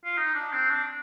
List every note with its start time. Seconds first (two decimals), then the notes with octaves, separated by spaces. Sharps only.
0.05 F4
0.17 D#4
0.35 D4
0.53 C4
0.70 D4